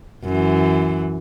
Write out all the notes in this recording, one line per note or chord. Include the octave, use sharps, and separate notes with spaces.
F#2 E3